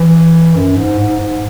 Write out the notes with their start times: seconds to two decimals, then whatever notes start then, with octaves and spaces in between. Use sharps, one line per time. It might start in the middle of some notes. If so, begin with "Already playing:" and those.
Already playing: E3
0.55 F#2
0.77 G#2
0.99 G#2
1.20 G#2